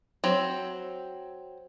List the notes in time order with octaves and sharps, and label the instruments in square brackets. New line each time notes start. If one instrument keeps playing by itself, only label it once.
[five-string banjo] F#3 C4